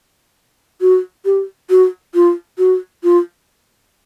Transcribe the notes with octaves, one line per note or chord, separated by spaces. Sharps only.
F#4
G4
F#4
F4
F#4
F4